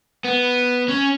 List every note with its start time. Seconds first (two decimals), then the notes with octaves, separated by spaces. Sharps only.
0.24 B3
0.88 C#4